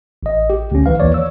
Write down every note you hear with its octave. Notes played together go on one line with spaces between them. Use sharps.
A1 D#5
G4
D2 C#4
B1 E3 B4 F5
D#2 E3 B4 C#5 D5
C#5 E6